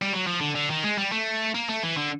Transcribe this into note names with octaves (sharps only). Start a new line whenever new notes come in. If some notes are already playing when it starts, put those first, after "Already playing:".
G3
F#3
F3
D3
D3
D#3
G#3
G3
A3
A#3
A3
E3
D3